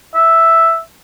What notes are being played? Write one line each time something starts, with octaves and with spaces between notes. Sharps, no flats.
E5